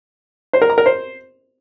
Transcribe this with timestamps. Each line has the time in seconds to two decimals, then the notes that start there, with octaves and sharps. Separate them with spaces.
0.53 C5
0.62 A#4
0.70 A#5
0.78 A#4
0.86 C5